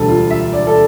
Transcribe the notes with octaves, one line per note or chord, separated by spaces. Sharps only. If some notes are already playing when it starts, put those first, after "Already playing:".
Already playing: E1 D2 D3 G3 A4
F4
E5
D5
A4